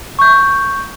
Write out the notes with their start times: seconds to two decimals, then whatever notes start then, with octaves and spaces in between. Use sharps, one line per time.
0.19 C#6 G6